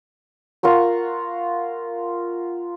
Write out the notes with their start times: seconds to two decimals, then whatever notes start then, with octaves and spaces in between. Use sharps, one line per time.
0.63 F4 A#4 F#5 C#6